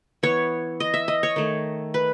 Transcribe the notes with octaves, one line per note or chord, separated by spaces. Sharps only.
E3 B3 C#5
D#5
E5
D#5
C#5
D#3 A3
B4